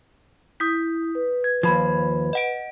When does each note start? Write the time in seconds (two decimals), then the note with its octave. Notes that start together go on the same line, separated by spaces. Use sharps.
0.60 E4 D#6 G6 B6
1.15 B4
1.44 G#6
1.63 D#2 F3 B5 G#6
2.33 D#5 F#5 D7